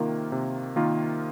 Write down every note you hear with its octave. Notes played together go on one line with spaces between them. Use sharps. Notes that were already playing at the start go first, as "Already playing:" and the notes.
Already playing: C3 D#3 A#3 F4
C3
D#3 A#3 F4